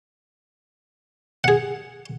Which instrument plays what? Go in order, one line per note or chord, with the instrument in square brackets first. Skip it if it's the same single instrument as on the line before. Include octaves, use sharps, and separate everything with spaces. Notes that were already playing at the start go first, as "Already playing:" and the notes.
[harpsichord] G#4 F#5